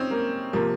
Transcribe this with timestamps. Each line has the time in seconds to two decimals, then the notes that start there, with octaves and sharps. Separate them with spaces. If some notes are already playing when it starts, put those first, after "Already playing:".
Already playing: C4 C#4 D#4
0.11 A#3
0.53 C3 F3 A#3